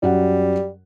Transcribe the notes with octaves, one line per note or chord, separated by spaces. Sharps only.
F#2 G3 F#4 F#5